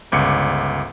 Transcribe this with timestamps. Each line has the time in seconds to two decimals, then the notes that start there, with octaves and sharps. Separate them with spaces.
0.12 G1 C#2 D6 C#7